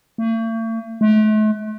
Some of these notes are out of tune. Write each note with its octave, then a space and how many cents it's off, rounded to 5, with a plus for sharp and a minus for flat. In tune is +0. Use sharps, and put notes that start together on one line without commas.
A3 +45
A3 -40